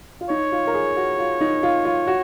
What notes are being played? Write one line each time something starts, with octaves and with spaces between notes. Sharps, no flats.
F4
D#4 C#5
F4
A#4
G#4
F#4
F4
D#4
F4
F4
F#4